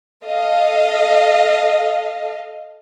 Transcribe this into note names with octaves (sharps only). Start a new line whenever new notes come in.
A4 D#5 F5